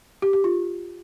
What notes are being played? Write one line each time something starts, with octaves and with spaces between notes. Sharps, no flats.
G4
G4
F4